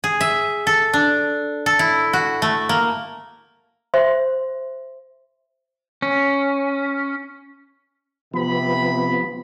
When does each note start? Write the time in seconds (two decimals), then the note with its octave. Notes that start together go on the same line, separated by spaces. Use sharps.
0.04 G#4
0.21 E5
0.67 A4
0.93 D4
1.66 A4
1.79 E4
2.13 F#4
2.42 A3
2.69 A#3
3.94 C5 E5 C6
6.02 C#4
8.34 C3 F3 B3 B5